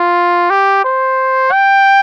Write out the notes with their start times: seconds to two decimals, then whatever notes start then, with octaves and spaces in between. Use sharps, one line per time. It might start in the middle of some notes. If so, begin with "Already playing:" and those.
Already playing: F4
0.50 G4
0.84 C5
1.52 G5